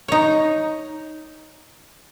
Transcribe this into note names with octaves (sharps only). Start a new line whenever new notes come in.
D#4 C#5